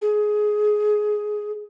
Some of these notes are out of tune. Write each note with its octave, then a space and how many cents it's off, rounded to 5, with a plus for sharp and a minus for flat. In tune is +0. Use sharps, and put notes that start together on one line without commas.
G#4 +15